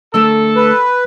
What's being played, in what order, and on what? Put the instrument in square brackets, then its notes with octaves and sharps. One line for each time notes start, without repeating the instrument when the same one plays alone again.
[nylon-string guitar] D3 A3 A#4 [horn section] A4
[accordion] B4